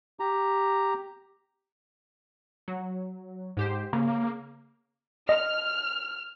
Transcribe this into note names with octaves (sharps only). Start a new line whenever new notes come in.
G4 A#5
F#3
G#2 G4 C5
C#3 A#3
D#5 F6